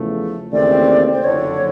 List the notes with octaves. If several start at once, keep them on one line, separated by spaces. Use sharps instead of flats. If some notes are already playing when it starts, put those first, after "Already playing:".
Already playing: E2 C#3 F3 A3
D#2 C#3 E3 A3 C4 D5
C5
F#1 F2 D3 C#5